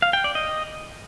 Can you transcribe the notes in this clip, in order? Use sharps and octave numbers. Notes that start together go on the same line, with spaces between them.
F5
G5
D5
D#5